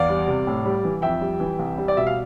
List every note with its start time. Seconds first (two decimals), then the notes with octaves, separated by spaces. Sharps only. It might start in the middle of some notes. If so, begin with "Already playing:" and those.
Already playing: E2 D5 F5
0.09 G3
0.27 C3
0.47 A2
0.65 G3
0.84 E3
1.02 F2 E5 G5
1.21 G3
1.40 E3
1.59 C2
1.78 G3
1.88 D5
1.97 B2 E5
2.07 F5